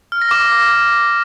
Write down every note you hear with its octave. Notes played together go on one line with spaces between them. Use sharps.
F6
A#6
D6